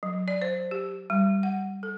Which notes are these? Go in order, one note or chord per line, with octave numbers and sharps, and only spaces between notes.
F#3
D5
C5
G4
G3
F#5
A4